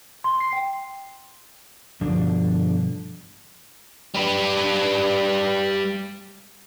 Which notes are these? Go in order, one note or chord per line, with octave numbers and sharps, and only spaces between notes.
C6
C7
G5
G2 B2 D3 F3 D4
G3 B4